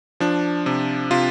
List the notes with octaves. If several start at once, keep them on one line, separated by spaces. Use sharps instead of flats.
F3 D4
C3
C3 F4